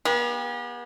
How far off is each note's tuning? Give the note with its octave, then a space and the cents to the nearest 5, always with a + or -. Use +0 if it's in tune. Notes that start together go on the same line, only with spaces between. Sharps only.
B3 -40 G4 +40